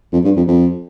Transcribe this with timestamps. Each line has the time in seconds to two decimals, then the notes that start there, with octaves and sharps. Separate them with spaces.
0.13 F2
0.25 G2
0.37 F2
0.48 F2